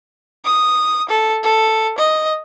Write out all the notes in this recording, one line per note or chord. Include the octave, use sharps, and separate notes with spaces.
D#6
A4
A4
D#5